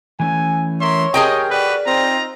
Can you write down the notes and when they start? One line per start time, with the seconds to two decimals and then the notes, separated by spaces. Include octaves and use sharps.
0.20 E3 A3 C#4 G#5
0.81 A#4 C#5 E5 C6
1.14 G4 G#4 A#4 D#5 G5
1.51 F#4 G4 B4 D5
1.87 C4 D#4 F4 A#5